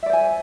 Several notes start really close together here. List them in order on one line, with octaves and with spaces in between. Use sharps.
E5 D5 C5 G#5